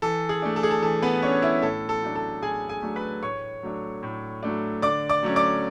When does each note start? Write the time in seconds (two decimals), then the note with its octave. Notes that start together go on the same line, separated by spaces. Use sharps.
0.02 E3 A4
0.29 G#4
0.42 A3 D4
0.56 A4
0.63 G#4
0.71 A4
0.82 E3 A4
1.02 B3 B4
1.22 A3 C#4 D4 C#5
1.42 E4 E5
1.62 A2 A4
1.89 A4
2.02 F#3 A3 D4
2.15 A4
2.42 A2 G#4 G#5
2.69 G#4 G#5
2.82 F#3 A3 D4
2.96 B4 B5
3.23 A2 C#5 C#6
3.63 F#3 A3 D4
4.03 A2
4.43 F#3 A3 D4
4.82 D3 D5 D6
5.09 D5 D6
5.23 F#3 A3 C#4
5.36 D5 D6